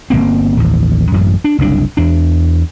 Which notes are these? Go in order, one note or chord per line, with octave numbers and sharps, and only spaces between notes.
G1 F#2 A#3 C4
A1 D#2
A1 F#2
D4
F#1 C2 D4
E2 D4